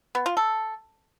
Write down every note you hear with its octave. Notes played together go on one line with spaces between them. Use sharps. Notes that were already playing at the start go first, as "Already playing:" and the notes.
B3
F4
A4